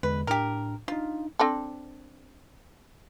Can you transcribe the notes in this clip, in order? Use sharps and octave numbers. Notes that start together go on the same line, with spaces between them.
E2 D3 G#3 B4
A2 D4 G4 A#4
D4 D#4 F4
C4 D4 A4